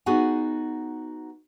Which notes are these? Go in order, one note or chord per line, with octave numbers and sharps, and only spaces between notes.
B3 D#4 F#4 G#4 F#5 G#5